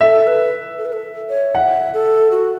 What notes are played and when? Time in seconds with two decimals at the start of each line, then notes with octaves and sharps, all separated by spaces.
0.01 A4 E5
0.27 B4
0.78 A4
0.85 B4
0.93 A4
1.29 C#5
1.55 E5 F#5
1.94 A4
2.31 F#4